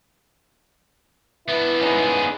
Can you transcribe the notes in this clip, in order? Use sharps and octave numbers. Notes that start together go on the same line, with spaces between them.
B3 D4 E4 B4
C#4 D#4 G#4